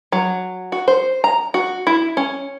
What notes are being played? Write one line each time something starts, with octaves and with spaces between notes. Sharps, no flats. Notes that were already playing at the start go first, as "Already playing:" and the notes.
F#3
F#4
C5
A#5
F#4
E4
C#4